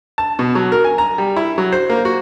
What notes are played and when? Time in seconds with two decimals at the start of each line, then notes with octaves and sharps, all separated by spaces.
0.18 A5
0.39 B2
0.55 F#3
0.72 A#4
0.85 G#5
0.98 A#5
1.18 G3
1.36 E4
1.58 F#3
1.72 C5
1.90 A#3
2.05 F#4